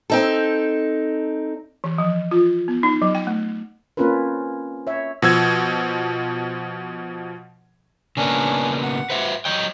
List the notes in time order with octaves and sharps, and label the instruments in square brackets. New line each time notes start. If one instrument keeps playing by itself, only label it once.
[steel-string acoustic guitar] C4 D#4 A4
[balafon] E3
F3
F4
B3
D#4
F#3
G5
A3
[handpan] A#3 C4 C#4 F4 A#4 B4
C#5 E5
[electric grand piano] B2 F3 E6 G#6
[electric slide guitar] C#3 A#3 B3 [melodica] C#4 D4
[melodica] F#5
[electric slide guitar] B4 C5 E5
[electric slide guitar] F#3 D#5 G5 [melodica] C#5